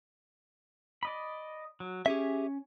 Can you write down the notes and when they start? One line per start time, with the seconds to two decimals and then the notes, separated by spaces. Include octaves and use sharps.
1.03 D5 D#5 B5
1.80 F#3
2.06 C#4 G4 G#4 E5